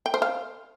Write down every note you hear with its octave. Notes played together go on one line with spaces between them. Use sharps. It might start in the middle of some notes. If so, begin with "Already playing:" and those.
G5
C5
F5